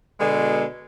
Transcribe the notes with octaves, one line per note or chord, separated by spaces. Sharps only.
B2 D3 G#3